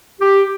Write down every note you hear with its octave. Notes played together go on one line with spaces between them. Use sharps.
G4